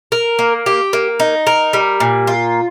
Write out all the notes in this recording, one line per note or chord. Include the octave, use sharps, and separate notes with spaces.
A#4
A#3
G4
A#3
D#4
A#4
G3
A#2
F4